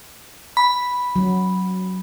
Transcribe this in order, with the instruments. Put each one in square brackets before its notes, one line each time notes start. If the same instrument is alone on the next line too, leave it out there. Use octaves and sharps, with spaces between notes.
[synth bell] B5
[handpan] F#3